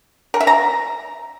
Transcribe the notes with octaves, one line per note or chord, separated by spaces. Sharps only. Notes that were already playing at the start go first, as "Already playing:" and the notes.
A#4
E5
A#5